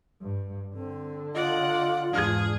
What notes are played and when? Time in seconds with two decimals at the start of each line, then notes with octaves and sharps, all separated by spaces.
0.22 G2
0.74 D3 C4
1.35 F4 D5 D#5 F#5
2.13 E2 G#2 D4 G#4 F6 G#6